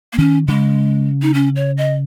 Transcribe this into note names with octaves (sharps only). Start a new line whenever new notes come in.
A#3
D#3 C#4
C#3 G#3
D#4
C#4
C#5
D#5